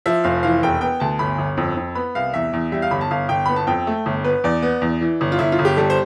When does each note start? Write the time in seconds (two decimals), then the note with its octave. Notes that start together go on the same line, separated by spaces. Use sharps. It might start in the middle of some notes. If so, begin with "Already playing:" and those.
0.06 F3 E5
0.24 F1 F5
0.43 E3 F5
0.63 E1 G5
0.81 B3 G5
1.00 D2 A5
1.19 G1 B5
1.38 G1
1.57 F2
1.77 F2
1.95 B3 B5
2.15 C2 F5
2.34 E2 E5
2.53 E2
2.72 G3 E5
2.82 F5
2.91 G1 B5
3.01 A5
3.11 G1 F5
3.29 G1 G5
3.46 B3 B5
3.56 A5
3.67 F2 G5
3.87 A3
4.06 G1
4.24 B3 B4
4.44 E2 D5
4.62 B3
4.82 E2
5.01 E3
5.21 G1
5.32 F4
5.39 G1 E4
5.52 F4
5.59 G1
5.65 G4
5.77 G3 A4
5.90 C5